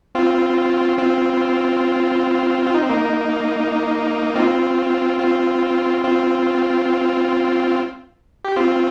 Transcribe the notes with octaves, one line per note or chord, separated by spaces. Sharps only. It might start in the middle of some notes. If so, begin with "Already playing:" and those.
C4 F4
C4 F4
F4
D#4
C4
A#3 D#4
C4 F4
C4 F4
C4 F4
G4
C4 F4